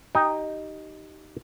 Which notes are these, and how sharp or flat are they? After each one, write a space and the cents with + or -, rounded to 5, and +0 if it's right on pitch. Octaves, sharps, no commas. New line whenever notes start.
D#4 +0 G4 -20 G5 +30